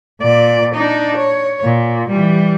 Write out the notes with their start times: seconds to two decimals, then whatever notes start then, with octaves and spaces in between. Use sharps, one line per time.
0.21 A#2 D5
0.74 D4 D#4
1.17 C#5
1.64 A#2
2.10 E3 G3